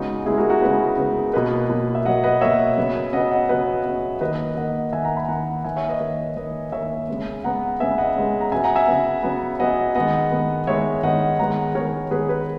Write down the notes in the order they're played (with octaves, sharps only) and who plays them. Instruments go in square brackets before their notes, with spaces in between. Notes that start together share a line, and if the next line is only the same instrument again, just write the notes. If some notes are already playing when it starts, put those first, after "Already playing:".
Already playing: [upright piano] C#3 G#3 B3 D#4 F#4
C#3 G#3 B3 E4 G#4
F#4 A#4
F#4 A#4
C#3 G#3 B3 G#4 B4
C#3 G#3 B3
B2 F#3 A#3 B4 D#5
B2 F#3 A#3
E5
B2 F#3 A#3 D#5 F#5
B4 D#5
B2 F#3 A#3 C#5 E5
C#3 F#3 B3
C#3 F#3 B3 D#5 F#5
D#5 F#5
C#3 F#3 B3 B4 D#5
C#3 F#3 B3
D#3 A#3 B4 D#5
D#3 A#3 D#5 F#5
D#3 A#3 E5 G#5
F#5 A#5
G#5 B5
D#3 A#3 F#5 A#5
D#3 A#3 E5 G#5
C#5 E5
B4 D#5
D#3 A#3 B4 D#5
D#3 A#3 B4 D#5
D#3 A#3 C#5 E5
C#3 G#3 B3
C#3 G#3 B3 F#5 A#5
C#3 G#3 B3 E5 G#5
D#5 F#5
C#3 G#3 B3
A#5
C#3 F#3 B3 E5 G#5
F#5 A#5
E5 G#5
C#3 F#3 B3
C#3 F#3 B3
C#3 F#3 B3 D#5 F#5
D#3 G#3 B3 D#5 F#5
D#3 G#3 B3
D#3 G#3 B3 C#5 E5
D#3 G#3 B3 D#5 F#5
D#3 G#3 B3 F#5 A#5
D#3 G#3 B3 A#4 C#5
D#3 G#3 B3 G#4 B4
G#4 B4